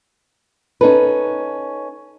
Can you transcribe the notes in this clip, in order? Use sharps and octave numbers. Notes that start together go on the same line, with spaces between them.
C#4 D#4 A4 B4